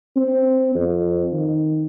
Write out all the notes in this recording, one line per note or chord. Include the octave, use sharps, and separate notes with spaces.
C4
F2
D#3